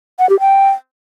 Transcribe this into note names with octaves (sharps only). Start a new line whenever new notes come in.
F#5
G4
G5